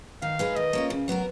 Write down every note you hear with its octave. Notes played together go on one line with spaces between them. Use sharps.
D#3 F5
G#3 D#4 G#4 B4
D#3 D#5
A#3 C#4 F4
C#3
F#3 B3 F#4 A#4